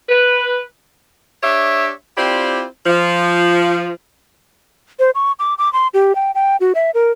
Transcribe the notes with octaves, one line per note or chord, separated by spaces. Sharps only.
B4
D4 G4 C#5 E5
C4 E4 F4 G4 C5 D5
F3
C5
C#6
D6
D6
C6
G4
G5
G5
F#4
E5
A#4